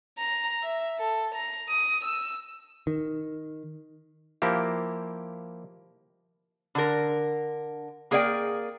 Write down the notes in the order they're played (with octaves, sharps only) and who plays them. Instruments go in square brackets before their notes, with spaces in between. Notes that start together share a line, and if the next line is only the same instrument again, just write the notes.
[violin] A#5
E5
A4
A#5
D#6
E6
[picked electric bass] D#3
[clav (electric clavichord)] F3 A#3 E4 G4
[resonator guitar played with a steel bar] D3 A#4
A#3 G#4 A#4 D5 F5 G5